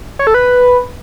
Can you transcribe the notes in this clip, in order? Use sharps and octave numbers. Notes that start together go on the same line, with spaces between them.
C#5
A4
B4